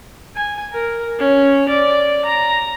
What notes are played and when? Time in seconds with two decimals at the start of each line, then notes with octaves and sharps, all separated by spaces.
0.36 G#5
0.72 A#4
1.18 C#4
1.68 D5
2.25 A#5